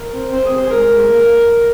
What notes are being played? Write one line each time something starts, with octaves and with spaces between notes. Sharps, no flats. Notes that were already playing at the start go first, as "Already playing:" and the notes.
Already playing: A#4
C4
C4 C5
G#4
C3
C5
G#4
G#2 A#4
G#2
A#3